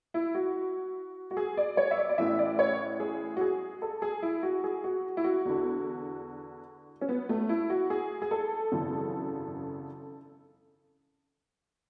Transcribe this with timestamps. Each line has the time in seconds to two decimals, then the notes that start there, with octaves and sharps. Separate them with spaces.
0.14 E4
0.35 F#4
1.31 F#4
1.37 G#4
1.57 D5
1.77 C#5
1.91 E5
1.98 D5
2.09 D5
2.18 A1 A2 E3 E5
2.39 D5
2.59 C#5
3.00 G#4
3.37 F#4
3.41 G#4
3.82 A4
4.02 G#4
4.22 E4
4.43 F#4
4.64 G#4
4.84 F#4
5.17 E4
5.24 F#4
5.45 E2 D3
7.01 C#4
7.09 B3
7.29 A3
7.49 E4
7.70 F#4
7.90 G#4
8.22 G#4
8.31 A4
8.72 G#1 F#2 C#3 E3